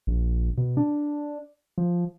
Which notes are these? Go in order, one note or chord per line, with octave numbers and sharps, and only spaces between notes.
A#1
B2
D4
F3